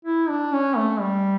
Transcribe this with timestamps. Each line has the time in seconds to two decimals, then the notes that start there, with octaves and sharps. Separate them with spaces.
0.05 E4
0.29 D4
0.53 C#4
0.76 A3
1.01 G3